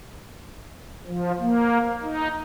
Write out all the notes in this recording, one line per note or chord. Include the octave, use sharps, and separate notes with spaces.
F3
A#3
D#4